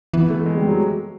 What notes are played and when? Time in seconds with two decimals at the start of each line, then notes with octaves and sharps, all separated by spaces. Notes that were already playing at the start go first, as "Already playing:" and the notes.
0.14 E3 B3
0.30 A3
0.46 G#3
0.57 G3
0.68 F#3